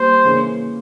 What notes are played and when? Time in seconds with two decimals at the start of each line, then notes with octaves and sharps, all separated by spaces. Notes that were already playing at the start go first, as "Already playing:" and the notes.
Already playing: G3 A#3 C5
0.24 C#3 E3 A#3 C#4